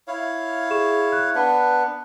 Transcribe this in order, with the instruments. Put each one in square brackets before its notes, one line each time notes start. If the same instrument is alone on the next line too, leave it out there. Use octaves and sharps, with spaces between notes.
[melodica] E4 C#5 F5
[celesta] G#4 C#6 E7
F#6
[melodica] B3 D4 B4